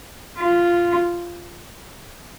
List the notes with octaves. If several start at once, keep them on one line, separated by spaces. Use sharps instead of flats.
F4